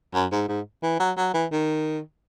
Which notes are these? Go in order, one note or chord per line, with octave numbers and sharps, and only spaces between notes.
F#2
G#2
G#2
E3
F#3
F#3
E3
D#3